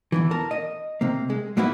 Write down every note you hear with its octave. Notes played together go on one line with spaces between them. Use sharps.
E2 G2 E3
A#4 A5
D#5
C3 A#3
G#3
G#2 A#3 B3 E4 F#4